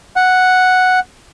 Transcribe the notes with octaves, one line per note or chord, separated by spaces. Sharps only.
F#5